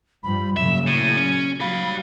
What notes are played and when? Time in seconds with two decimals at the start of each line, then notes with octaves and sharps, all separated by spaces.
0.23 G2 F3 G3 B5
0.57 A#2 C#3 F#3 E5 E7
0.87 A2 D#7
1.17 C#4
1.60 F#3 G3 G4 F5 B5